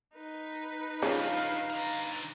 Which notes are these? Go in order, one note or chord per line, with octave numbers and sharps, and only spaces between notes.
D#4 B4
G2 C#3 F3 F5
D3 A#5